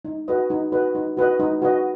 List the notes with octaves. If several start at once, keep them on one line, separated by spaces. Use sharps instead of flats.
D#4
F#4 B4 D#5
D#4
F#4 B4 D#5
D#4
F#4 B4 D#5
D#4
F#4 B4 D#5